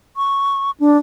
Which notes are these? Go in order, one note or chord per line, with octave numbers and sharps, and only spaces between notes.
C#6
D4